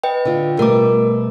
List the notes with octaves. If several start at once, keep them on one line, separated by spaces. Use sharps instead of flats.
B4 D#5 G5
D3 F4
B2 G3 A3 A#4 D6